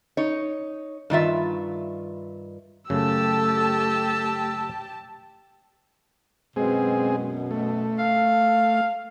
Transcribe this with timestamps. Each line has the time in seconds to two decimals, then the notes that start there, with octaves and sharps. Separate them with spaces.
0.17 D#4 C#5
1.10 G2 D#3 F4 E5
2.90 F#2 C#3 A3 G4 A5 E6
6.56 F#2 B2 G#3 C4 G#4
7.51 A3
7.99 F5